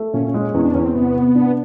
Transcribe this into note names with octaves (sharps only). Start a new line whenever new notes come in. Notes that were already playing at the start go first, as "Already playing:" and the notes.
Already playing: A3
A#2 C#4
C#4
G#3
C#4
E2 C#4
D4
E2 C#4
C4
C3 B3
C3
D4